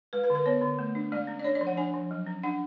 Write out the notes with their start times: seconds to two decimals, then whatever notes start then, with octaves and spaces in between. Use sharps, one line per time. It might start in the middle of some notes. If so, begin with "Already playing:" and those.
0.13 G#3 B4
0.24 B4
0.30 D3
0.35 B4
0.46 B3 C#5
0.62 D3
0.79 A3
0.95 D4
1.12 G#3 D5
1.27 C#4
1.39 D5
1.44 D4 C#5
1.55 D5
1.61 F3
1.67 F#5
1.77 D4 G#5
1.94 F3
2.11 F#3
2.27 C#4
2.43 D4 F#5